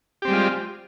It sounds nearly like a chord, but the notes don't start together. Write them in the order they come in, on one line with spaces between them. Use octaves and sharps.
G4 C4 G3 G#3 F4